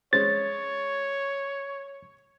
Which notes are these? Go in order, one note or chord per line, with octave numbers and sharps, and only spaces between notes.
G#3 C#4 C5 C#5 A6